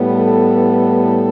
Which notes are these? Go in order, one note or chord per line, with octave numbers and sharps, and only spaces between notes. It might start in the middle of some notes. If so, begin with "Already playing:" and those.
Already playing: A2 G3 B3
A4